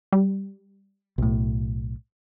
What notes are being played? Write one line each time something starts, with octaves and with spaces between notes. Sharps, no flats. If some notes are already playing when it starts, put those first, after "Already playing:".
G3
B1 A2